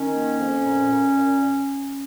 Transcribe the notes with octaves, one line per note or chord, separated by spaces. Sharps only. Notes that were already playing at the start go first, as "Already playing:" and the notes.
Already playing: D#3 C#4
A#3
F2
A#2
A#2
A#2